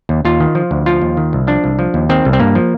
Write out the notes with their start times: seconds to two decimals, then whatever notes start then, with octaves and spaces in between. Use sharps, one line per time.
0.09 D#2
0.25 D#2 F4
0.40 D#3
0.55 F3
0.71 D2
0.86 F3 F4
1.02 D#2
1.17 D#3
1.33 C2
1.47 F3 D4
1.64 C2
1.79 F3
1.94 D#2
2.09 D#3 C4
2.25 C2
2.33 C4
2.40 G2 A#3
2.55 F3